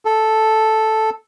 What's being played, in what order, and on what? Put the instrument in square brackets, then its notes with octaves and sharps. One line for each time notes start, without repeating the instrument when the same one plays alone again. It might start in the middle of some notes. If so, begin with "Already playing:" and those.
[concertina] A4